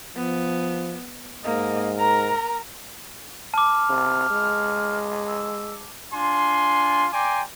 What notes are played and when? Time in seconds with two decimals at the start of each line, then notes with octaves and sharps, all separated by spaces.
0.16 F3 B3
1.44 G#2 A#3 D#5
1.99 A#4 A#5
3.54 A5 D6 F6
3.90 C3
4.30 G#3
5.27 E6
6.13 D4 F4 G#5 C6
7.13 D5 G5 G#5 A#5 C6 D6